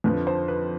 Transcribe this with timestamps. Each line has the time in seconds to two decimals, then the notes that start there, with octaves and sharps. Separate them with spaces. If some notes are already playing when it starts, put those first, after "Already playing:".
0.04 F2 D3 F3 B4
0.27 C5
0.48 B4